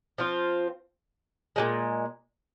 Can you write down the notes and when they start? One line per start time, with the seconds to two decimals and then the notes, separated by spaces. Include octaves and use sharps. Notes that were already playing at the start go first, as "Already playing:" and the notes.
0.18 F3 C4 F4
1.56 A#2 F3 G#3